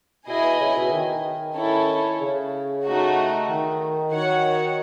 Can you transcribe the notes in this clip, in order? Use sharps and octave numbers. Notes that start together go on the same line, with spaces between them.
B2 E4 G#4 D#5 G#5
B2
C#3
B2
D#3
C#4 E4 A4 C#5
C#3
A3 D#4 F#4
D#3
D#3 F#4 C#5 F#5